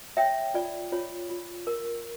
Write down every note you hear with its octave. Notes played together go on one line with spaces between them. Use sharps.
C#5 E5 G5
F4 D5
F4 C#5
F4
A#4